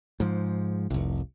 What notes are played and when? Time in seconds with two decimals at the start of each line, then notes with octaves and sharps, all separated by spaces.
0.20 G#2 F3
0.90 F1 C2